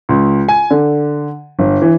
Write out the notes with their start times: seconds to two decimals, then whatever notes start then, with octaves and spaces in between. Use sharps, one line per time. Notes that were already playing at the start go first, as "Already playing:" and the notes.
0.09 C#2
0.49 G#5
0.71 D3
1.59 G1
1.82 E3